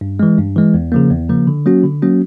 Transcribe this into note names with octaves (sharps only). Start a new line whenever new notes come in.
G2
E3 G#3
G2
E3 G#3
E2
C#3 F3 A#3
E2
C#3 F3 A#3
D3
F#3 A#3 C#4 F#4
D3
F#3 A#3 C#4 F#4